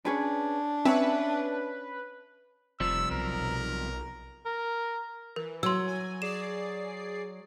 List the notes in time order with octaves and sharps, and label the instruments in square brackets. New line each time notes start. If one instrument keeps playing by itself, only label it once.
[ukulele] C#4 G#4 B4 [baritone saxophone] D4
[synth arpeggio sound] C4 [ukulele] C#4 E5 [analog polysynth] B4
[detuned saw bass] F1 [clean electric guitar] C3 F3 G3 [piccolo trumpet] E6
[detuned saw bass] B1 [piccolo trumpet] A#4
[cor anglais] A#4
[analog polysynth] E3 [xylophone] A#4
[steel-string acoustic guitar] F#3 [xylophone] C6 E6
[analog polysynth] G#5
[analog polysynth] G#4 D5 C7 [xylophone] E7